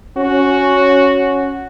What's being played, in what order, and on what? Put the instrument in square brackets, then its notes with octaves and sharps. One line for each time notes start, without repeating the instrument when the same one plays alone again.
[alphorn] C#4 [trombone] F#4